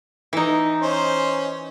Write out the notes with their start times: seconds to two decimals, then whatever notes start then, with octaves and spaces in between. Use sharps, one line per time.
0.33 E3 D#4
0.82 C#4 C5